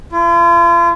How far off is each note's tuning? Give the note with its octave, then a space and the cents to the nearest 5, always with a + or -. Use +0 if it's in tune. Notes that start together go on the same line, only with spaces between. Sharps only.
F4 -45